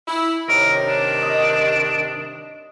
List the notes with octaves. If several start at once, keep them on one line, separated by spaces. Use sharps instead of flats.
E4
G2 C3 D#3 A#4 C#5
D4
D#5